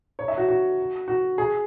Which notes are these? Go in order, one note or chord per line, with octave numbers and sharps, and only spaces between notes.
C#5
E5
F#4
F#4
F#4
G#4